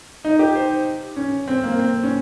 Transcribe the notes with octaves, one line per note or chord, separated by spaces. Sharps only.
D#4
G4
C5
C#4
C4
A#3
C4
C#4